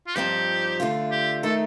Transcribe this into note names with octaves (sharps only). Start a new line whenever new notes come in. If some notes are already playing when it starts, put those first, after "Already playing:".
F4
G2 F3 C4 D#4 G4
D3 A3 D4 F4
G4
D#3 A3 D#4 A4